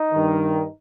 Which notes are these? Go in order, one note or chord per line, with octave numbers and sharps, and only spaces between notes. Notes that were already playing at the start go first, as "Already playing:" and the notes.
Already playing: D#4
G2 D#3